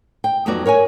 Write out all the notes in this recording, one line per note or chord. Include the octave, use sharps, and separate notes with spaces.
G5
F2 F#3 B3 D#4 F#4 D5
A#4 C#5 F5 G#5